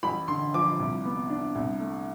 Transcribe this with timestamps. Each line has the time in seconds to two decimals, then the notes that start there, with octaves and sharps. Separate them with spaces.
0.03 A1 B5
0.28 D3 C6
0.54 F3 D6
0.79 C2
1.05 B3
1.29 D4
1.55 C2
1.80 A3